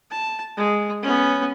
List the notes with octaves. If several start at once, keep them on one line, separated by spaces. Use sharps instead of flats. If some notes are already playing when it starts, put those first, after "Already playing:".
A5
G#3
B3 C#4